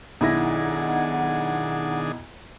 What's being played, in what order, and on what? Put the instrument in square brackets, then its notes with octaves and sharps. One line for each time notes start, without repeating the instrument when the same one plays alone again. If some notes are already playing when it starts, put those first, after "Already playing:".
[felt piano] B1 E4 A#6 [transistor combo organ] D#3 D4 G#4 [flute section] F#5